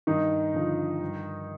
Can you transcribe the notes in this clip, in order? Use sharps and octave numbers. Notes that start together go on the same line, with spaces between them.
G2 D#3 D#4
D3 F3
G2